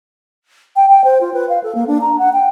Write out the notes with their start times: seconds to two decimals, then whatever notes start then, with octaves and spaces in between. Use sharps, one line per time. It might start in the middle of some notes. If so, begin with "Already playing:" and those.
0.76 G5
0.89 G5
1.04 C5
1.21 F4
1.34 B4
1.49 F5
1.63 A4
1.75 A#3
1.87 D4
2.01 A#5
2.18 F#5
2.33 G5